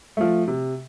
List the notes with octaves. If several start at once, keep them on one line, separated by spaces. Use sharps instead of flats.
F3 A3
C3